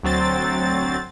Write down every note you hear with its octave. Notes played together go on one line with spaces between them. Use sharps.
D2 F#3 C4 A6